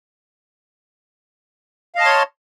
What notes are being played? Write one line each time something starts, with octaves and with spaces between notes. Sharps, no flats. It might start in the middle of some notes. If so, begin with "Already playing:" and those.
C#5 D#5 F5 A5 C6